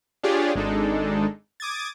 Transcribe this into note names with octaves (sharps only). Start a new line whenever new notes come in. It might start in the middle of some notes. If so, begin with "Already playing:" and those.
D4 F4 G4 G#4 C#5 D5
G#1 G#3 D4 D#4 A4
D6 D#6 G#6 A6